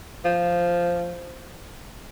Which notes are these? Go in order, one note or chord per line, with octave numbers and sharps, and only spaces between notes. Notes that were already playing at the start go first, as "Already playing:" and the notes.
F3